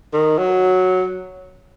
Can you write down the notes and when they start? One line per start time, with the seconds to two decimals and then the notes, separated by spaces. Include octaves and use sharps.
0.14 D#3
0.38 F#3